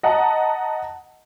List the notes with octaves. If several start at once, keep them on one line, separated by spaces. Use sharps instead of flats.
D#5 F#5 A5 A#5